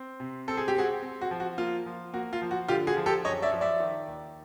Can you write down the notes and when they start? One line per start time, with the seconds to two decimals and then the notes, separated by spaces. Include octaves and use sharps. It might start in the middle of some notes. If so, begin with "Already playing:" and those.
Already playing: C4
0.20 C3
0.48 C4 A4
0.57 G#4
0.68 G4
0.75 C4 F#4 G#4
1.02 C4
1.21 F#4
1.31 F3
1.40 F#4
1.58 A#3 F4
1.86 F3
2.13 A#3 F#4
2.33 F4
2.42 F3
2.51 F#4
2.68 D3 F4 G4
2.87 F#4 G#4
2.97 F3
3.06 G4 A4
3.25 F#2 C#5 D#5
3.42 D5 E5
3.52 F3
3.61 D5 E5
3.80 D#3
4.07 D#2